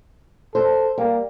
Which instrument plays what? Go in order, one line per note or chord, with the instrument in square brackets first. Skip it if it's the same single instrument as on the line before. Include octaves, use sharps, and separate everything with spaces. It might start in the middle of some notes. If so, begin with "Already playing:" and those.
[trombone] A4 [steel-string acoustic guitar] C5
[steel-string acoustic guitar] G3 [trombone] A#3